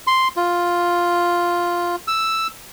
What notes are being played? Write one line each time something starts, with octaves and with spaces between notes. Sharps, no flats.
C6
F4
E6